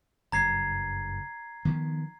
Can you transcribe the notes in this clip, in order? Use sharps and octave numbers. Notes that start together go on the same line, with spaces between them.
F#1 G2 A#5 G#6 C7
D#3 F3 B3